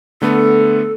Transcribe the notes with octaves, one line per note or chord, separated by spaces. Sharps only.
D3 A3 B3 A4